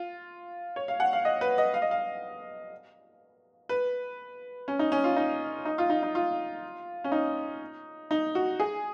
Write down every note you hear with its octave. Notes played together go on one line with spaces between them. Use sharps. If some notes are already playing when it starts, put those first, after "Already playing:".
Already playing: F4
C#5
F5
F#5
F5
D#5
B4
D#5
F5
D#5
F5
B4
C#4
D#4
C#4
F4
D#4
D#4
F4
D#4
D#4
F4
C#4
D#4
D#4
F#4
G#4